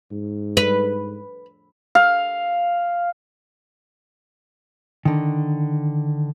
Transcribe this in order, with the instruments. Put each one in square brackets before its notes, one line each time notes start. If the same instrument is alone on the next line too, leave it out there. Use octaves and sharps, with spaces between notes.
[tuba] G#2
[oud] B4
[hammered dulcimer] F5
[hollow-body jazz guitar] D3 D#3